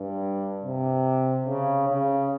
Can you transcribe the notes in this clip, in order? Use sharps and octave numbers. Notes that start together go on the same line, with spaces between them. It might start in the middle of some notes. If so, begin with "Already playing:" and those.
Already playing: G2
C3
C#3
C#3